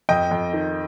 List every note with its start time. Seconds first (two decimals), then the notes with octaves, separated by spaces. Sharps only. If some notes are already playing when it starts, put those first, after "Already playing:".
0.09 F2 D#5 G5
0.31 F2
0.53 D#3